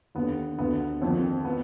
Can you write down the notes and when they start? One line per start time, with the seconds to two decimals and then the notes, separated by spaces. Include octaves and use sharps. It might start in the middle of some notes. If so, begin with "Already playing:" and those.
0.15 D#2 D3 B3
0.58 D2 D3 B3
1.02 F2 D#3
1.45 B3